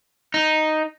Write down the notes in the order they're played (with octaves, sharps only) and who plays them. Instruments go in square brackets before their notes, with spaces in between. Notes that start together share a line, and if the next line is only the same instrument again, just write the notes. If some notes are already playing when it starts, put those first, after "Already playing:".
[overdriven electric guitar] D#4